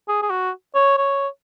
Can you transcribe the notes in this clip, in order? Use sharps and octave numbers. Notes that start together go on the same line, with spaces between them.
G#4
G#4
F#4
C#5
C#5